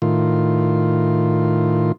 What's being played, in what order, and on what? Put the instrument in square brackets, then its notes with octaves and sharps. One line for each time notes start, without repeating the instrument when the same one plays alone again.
[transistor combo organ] A2 D#3 F4